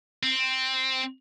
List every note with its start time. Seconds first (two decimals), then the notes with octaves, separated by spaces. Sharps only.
0.23 C4